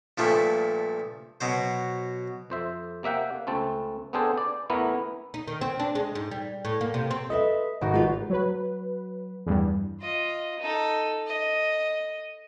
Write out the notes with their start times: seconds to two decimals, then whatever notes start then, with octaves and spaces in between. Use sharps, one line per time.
0.18 G2 A#2 F3 A3
1.41 B2 F#3 C5
2.50 F2 C5 E5
3.03 C3 A#3 E5 F#5 G5
3.47 C#2 A3 C4 A5
4.13 B3 C4 D4 G#4 A4 C5
4.38 D5
4.70 E3 A3 B3 E4 A#4
5.34 D#4
5.47 D#3
5.61 C4
5.80 D4
5.95 G#3
6.15 G#2
6.31 G3
6.65 A2
6.81 A#3
6.94 C3
7.11 C4
7.30 A4 B4 D#5 E5
7.81 G#1 D#4 F#4 A#4 C5
7.94 G#3 F4 G4 B4
8.30 F#3 B4
9.46 E2 G2
10.01 F4 D#5
10.60 D#4 A4
11.26 D#5